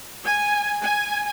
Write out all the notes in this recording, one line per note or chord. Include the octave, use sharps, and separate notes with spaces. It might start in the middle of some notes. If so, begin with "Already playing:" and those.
G#5
G#5